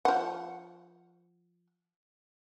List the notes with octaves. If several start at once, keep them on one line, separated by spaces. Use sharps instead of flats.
F3 F#5